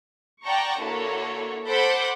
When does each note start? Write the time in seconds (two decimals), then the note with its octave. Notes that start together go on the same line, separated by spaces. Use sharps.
0.43 D5 F#5 G5 A5 A#5 C#6
0.81 D3 A#3 E4 F#4 A4 C#5
1.67 A4 C5 F#5 B5 D6 G6